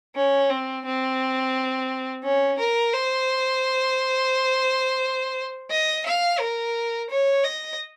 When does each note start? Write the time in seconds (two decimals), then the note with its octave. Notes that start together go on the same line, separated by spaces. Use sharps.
0.15 C#4
0.50 C4
0.85 C4
2.23 C#4
2.59 A#4
2.93 C5
5.70 D#5
6.06 F5
6.39 A#4
7.10 C#5
7.44 D#5